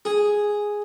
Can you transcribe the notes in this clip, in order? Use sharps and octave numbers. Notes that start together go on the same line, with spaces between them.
G#4